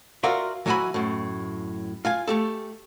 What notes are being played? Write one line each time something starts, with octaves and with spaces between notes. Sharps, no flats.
F4 F#4 A#4 D5 E5
E3 F#3 E4 F#4 G#5 B5
F#2 A2
F4 F5 G#5
A3 G4 A4